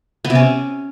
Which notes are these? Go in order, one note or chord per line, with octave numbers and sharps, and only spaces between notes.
B3
C3
C#4